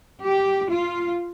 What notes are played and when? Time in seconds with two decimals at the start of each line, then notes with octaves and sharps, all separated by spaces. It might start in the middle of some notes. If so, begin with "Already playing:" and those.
0.21 G4
0.67 F4